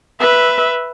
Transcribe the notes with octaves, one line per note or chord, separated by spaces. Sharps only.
B4 E5